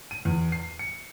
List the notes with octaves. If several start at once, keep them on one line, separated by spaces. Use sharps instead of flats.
D#7
E2
C7
C#7